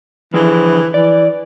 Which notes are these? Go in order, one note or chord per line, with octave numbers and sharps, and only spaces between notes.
D3 E3 F3 G#4
E3 D5